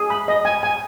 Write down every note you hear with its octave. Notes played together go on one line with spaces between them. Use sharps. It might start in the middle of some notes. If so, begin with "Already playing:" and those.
Already playing: G#4
B5
D#5
G#5
G#5